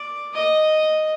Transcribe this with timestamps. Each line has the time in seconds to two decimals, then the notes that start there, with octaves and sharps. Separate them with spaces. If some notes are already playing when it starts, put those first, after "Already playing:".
Already playing: D5
0.34 D#5